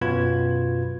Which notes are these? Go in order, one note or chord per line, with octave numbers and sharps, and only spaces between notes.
F#2 B2 F4 B4 G#6